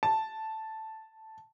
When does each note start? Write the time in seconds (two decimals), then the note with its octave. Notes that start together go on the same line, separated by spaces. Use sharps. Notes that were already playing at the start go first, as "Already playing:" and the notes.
0.03 A5